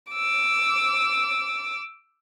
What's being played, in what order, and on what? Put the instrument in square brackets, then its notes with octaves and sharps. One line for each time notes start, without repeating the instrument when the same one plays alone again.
[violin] D6 E6